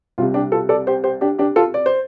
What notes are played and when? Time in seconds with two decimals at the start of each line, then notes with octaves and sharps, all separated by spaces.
0.18 C2 F4
0.21 C3
0.34 D4 G4
0.52 F4 A4
0.69 A4 D5
0.87 G4 C5
1.04 G4 C5
1.21 D4 G4
1.38 D4 G4
1.56 F4 A4
1.74 D5
1.86 C5